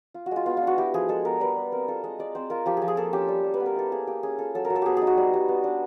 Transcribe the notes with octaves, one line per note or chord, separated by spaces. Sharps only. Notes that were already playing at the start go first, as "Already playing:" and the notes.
F4
F#4
G#3 F4
B3 F4
F4
D4 F#4
E4 G4
F3 G#4
G#3 A4
B3 A#4
G3 B4
G3
C4 A#4
F4 A4
G#3 D#5
G#3 D5
C4 C5
F4 A#4
F3 G4
F3 G#4
G#4
A#3 A4
C#4 G4
G3
G3
B4
B3
A#4
E4 A4
A#3 G#4
A#3 G4
C#4 G#4
F4 A4
F#3 A4
A#4
F#3
A4
B3 G4 G#4
D#4 G#4
F#4
G3
G3
B3
D4